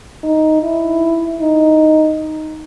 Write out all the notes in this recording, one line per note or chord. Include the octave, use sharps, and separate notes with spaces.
D#4
E4
D#4